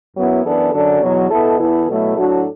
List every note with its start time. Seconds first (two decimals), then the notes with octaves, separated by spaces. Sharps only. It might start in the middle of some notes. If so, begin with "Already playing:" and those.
0.16 F#2 F#3 B3 E4
0.45 F#2 E3 B3 D4 A4
0.73 F#2 D3 F#3 D4 A4
1.02 E2 B2 F#3
1.30 B2 B3 E4 A4
1.60 E2 E3 B3 E4 A4
1.88 B2 F#3 A3 E4
2.17 A2 F#3 D4 F#4 A4